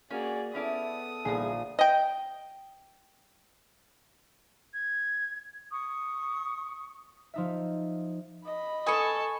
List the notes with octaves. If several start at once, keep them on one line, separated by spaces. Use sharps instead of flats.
A#3 C#4 F#4 G#4 D5
B3 C#4 E4 A4 D5 D#6
A#1 E2 G#4
D#5 G5
G#6
C#6 D#6
F3 D#4 E5
D#5 B5
A4 B4 G#5 A5 C#6 D#6